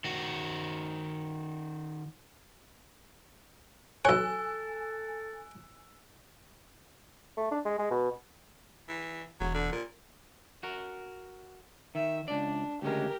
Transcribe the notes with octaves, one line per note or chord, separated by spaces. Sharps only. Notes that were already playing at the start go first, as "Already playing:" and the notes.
D#3 F#4
B1 A4 C#5 G#5 E6 F#6
A3
D4
G#3
G#3
B2
E3
E1 F#3
D3
A#2
F#4 A#4
D#3 E5
C#2 D4 D5
D2 C#3 G#3 G4 A#4